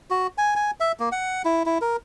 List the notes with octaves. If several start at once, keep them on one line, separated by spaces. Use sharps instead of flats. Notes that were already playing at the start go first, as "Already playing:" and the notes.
F#4
G#5
G#5
E5
A#3
F#5
E4
E4
A#4